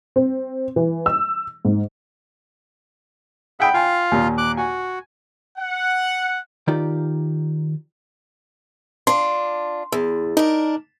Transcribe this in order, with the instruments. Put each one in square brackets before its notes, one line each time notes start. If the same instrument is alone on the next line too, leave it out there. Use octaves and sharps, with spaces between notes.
[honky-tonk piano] C4
E3
E6
G#2
[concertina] G#4 E5 [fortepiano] F#5 G5 B5
[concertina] F4 F5 [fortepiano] G5 G#5
[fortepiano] D#2 A#2
[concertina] D6 F#6
[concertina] F#4 [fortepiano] G#5
[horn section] F#5
[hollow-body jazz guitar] D#3 D#4 F4 G4 D5
[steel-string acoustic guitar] D4 F4 [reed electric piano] C6
[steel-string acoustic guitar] E2
[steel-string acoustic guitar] D4 A#4 [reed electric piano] D#4